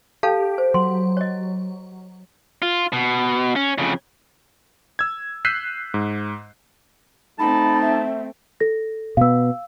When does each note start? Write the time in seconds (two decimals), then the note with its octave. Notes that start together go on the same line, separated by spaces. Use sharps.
0.23 G4 A4 F5 A5
0.58 C5
0.74 F#3 C6
1.17 C#5 D#5
2.62 F4
2.93 B2
3.56 C#4
3.78 F2 C#3
4.99 E6 G#6
5.45 E6 F#6 G6 B6 C7 D#7
5.94 G#2
7.39 A3 C4 D#4 A5 B5
7.82 E5
8.60 A4 A#6
9.17 B2 B3 F5 E6